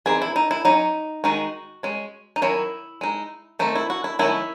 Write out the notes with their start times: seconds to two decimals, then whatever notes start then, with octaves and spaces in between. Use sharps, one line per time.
0.06 E3 C4 D#4 G#4
0.22 E4
0.36 D#4
0.51 E4
0.65 F#3 C#4 D#4
1.24 D#3 G#3 D#4 F#4
1.83 G#3 C#4
2.36 D#4
2.42 D#3 F#3 C#4 E4
3.01 G#3 D#4
3.59 D#3 A3 C4 D#4
3.75 E4
3.90 F#4
4.04 E4
4.19 D#3 F#3 A3 C#4 E4